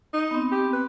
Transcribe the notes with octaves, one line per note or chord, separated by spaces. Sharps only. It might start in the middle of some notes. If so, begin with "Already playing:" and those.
D#4
B3 C4
G4
B4